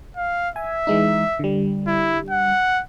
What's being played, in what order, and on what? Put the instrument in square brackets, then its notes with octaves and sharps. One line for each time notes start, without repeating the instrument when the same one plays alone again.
[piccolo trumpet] F5
[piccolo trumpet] E5 [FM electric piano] G#5
[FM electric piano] E3 G#3 D#4
D3 G3
[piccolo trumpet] E4
F#5